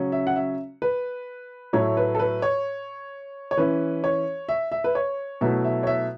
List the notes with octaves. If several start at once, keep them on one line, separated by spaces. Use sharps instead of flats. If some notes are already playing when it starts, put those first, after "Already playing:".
Already playing: C#3 F#3 C#4
E5
F#5
E5
B4
A2 F#3 A3 E4 C#5
B4
A4
B4
C#5
C#5
E3 C#4 E4 B4
C#5
E5
E5
B4
C#5
B2 F#3 A3 E4 E5
E5
C#5
E5